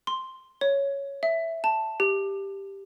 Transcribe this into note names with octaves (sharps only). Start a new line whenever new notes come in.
C6
C#5
E5
A5
G4